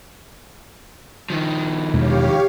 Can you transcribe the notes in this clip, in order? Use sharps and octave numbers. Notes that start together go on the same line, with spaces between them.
D#3 F3
E2 B2 G#3 G4 C#5 F5